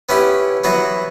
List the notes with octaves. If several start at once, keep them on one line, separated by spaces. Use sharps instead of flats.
B3 C#4 E4 G4
E3 F#3 B3 F#4